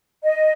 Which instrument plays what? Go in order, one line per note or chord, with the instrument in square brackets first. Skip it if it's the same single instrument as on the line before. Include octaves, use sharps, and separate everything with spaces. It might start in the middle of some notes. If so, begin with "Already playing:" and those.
[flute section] D#5